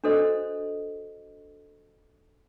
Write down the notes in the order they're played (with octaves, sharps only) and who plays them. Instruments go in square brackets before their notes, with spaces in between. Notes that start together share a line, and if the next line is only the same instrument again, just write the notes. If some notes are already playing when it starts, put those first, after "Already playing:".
[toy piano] D4 F#4 A4 C5 D#5